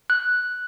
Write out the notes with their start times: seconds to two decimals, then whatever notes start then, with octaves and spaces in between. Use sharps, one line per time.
0.10 F#6